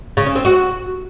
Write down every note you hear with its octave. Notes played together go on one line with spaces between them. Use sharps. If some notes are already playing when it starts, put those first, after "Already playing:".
C#3
C#4
C4
F#4